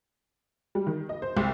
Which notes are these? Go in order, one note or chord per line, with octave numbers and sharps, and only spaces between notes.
G3
D#3
D#5
C5
C2